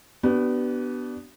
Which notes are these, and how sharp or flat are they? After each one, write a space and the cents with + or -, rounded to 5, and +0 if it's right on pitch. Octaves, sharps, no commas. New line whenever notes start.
B3 +0 D4 +0 G4 -40